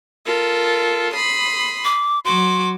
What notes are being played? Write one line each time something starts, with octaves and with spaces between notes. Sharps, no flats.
F4 A4 A#4
B5 C6 D#6
D6
F#3 F#4 C6 D6